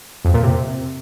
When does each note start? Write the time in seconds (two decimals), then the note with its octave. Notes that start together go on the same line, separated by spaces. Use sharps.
0.25 F2
0.34 A#2
0.43 C3